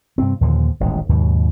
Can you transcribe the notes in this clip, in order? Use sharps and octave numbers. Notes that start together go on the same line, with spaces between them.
G2 C3 C4
D#2 A#2 D3 F3
D#1 A1 G#2 G#3
D#2 G#2 B2 F#3